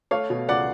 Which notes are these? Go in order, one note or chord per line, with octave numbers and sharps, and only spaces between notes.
A3 C#5 F5
B2
C#2 D5 F#5